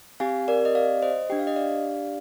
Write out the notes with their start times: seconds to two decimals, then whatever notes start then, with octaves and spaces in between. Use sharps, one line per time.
0.20 C4 G4 F5 G#5
0.48 A#4 D5
0.65 D#5
0.75 D5 F5
1.02 C5 D#5
1.30 D4 G4 G5
1.39 F5
1.47 D#5
1.56 D5 F5